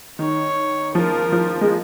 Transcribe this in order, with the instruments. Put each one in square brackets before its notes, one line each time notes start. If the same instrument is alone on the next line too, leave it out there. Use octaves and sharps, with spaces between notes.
[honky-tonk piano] D#3 [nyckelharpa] C#5
[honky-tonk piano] F3 [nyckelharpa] A#4
[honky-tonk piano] F3
G#3